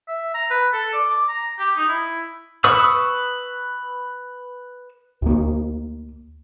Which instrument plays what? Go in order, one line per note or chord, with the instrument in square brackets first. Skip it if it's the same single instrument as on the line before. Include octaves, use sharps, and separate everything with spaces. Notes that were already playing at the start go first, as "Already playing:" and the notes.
[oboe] E5
A#5
B4
A4
D5
D6
A#5
G4
D#4
E4
[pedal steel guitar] B4 C#6 D#6 E6
[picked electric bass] D2 A#3